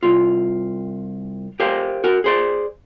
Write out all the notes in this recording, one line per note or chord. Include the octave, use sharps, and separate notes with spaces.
C2 F4
G4 A#4 C5 F5
F#4 A#4
G#4 C5 D5